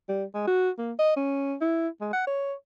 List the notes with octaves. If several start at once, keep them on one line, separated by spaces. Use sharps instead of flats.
G3
G#3
F#4
A#3
D#5
C#4
E4
G#3
F#5
C#5